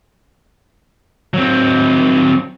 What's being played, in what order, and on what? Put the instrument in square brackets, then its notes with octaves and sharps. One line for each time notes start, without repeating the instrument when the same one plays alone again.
[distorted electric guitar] F#3 C4